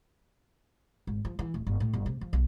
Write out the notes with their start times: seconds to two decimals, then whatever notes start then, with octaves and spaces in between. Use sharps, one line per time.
1.07 G#1
1.25 F3
1.39 E3
1.54 D1
1.67 G1
1.80 A2
1.93 G1
2.06 C3
2.21 F3
2.33 B1